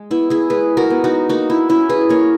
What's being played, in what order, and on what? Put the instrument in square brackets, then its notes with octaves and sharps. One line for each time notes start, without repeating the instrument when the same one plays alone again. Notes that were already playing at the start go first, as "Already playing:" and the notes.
Already playing: [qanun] G#3
B3 E4
E4 G#4
G#3 G#4 B4
F#4 A#4
B3
D#4 F#4
A#3 D#4 F#4
E4
C#4 E4
G#4 B4
A#3 A#4 C#5